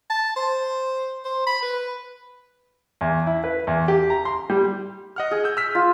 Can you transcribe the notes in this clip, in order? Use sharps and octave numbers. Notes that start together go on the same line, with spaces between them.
A5
C5
C5
B5
B4
E2
E4
B4
E2
G4
A#5
C6
G3
D#5 F#5 F6
G#4
E6 G6
E6 F6 B6
F4